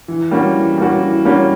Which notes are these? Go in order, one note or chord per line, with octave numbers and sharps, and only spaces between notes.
E3
G3 A#3 C#4 F#4
E3
G3 A#3 C#4 F#4
E3
G3 A#3 C#4 F#4